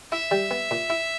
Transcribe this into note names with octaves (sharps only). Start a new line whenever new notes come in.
E4 E5
G3
B3
A#2
E4